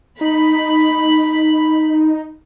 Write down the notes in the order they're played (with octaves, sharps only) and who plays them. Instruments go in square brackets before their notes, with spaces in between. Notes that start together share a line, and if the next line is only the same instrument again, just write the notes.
[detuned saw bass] D#4 [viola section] B5